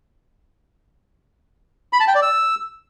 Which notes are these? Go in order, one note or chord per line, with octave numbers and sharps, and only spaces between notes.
B5
A5
G5
D5
E6